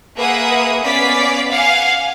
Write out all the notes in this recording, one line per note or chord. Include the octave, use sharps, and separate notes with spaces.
A#3 G#4 B4 E5 F#5 D#6
B3 C#4 D5 F5 B6
F5 F#5 G#5